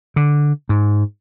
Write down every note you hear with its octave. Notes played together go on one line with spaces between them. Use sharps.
D3
G#2